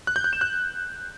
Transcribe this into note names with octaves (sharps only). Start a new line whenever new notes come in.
F#6
G6
F#6
E7
F#6